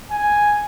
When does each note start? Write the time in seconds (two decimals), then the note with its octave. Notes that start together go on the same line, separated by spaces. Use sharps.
0.11 G#5